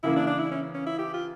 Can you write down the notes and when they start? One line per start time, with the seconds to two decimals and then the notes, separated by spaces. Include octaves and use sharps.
0.03 C#3 E3 A#3 E4
0.16 D4
0.27 D4
0.39 E4
0.52 C#4
0.75 C#4
0.87 E4
0.99 G4
1.14 F4